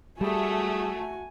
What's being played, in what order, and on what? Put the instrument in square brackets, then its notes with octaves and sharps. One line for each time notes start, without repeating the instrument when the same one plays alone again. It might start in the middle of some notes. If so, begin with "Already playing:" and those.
[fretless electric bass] G3 [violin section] A3 [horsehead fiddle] F#4 G#5 [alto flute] G#4